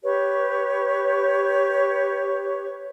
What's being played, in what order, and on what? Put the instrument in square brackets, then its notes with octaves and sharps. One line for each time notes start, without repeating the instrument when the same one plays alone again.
[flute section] G4 B4 C#5 C#6